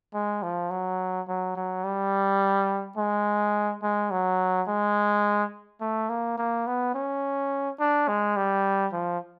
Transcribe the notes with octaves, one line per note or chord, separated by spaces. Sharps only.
G#3
F3
F#3
F#3
F#3
G3
G#3
G#3
F#3
G#3
A3
A#3
A#3
B3
C#4
D4
G#3
G3
F3